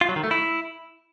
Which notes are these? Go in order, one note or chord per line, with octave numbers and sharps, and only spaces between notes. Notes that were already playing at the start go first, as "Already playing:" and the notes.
F4
F#3
D#3
A3
E4